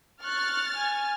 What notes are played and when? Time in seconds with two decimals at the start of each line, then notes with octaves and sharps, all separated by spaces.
0.23 C#6 F6 F#6 A6
0.75 G#5 G#6